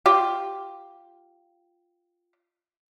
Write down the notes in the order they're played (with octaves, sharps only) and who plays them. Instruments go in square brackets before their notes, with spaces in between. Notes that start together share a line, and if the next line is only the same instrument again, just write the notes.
[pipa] F4 G4